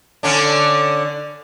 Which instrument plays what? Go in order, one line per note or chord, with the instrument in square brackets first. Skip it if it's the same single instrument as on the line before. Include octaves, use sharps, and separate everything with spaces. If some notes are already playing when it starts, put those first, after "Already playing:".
[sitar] D3 C#4 D4